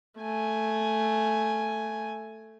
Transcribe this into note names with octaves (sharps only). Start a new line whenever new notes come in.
A3 G#5